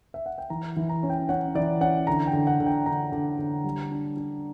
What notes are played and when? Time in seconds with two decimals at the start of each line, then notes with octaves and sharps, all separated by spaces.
0.14 E5
0.26 F#5
0.38 G5
0.50 E3 A#5
0.77 E3
0.89 A#5
1.03 C#4
1.10 G5
1.29 C#4 F#5
1.55 E3 D5
1.81 C#4 F#5
2.07 D3 A#5
2.27 G5
2.33 D3
2.47 F#5
2.60 D3
2.66 G5
2.86 D3 A#5
3.12 D3
3.39 D3
3.64 G3
3.91 D4
4.17 D4